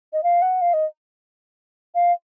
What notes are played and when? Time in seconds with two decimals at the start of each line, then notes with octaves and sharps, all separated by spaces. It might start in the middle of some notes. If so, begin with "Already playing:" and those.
0.13 D#5
0.23 F5
0.42 F#5
0.61 F5
0.74 D#5
1.95 F5